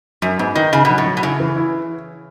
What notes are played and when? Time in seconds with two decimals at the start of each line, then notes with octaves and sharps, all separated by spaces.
0.22 F#2 F#3
0.39 G#2 B3
0.55 D#3 D#4
0.73 C#3 D#4
0.85 B2 F#3
0.98 A2
1.06 F#3
1.17 B2
1.23 C#3 E4
1.40 E3
1.56 E4